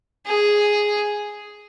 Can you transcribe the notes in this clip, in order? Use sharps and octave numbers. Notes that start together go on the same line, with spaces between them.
G#4